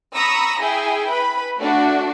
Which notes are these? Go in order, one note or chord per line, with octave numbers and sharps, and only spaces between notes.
A#5 B5 C#6 D#6 E6 A#6
E4 G#4 E5 G5 G#5
B4 B5
A3 D4 F#4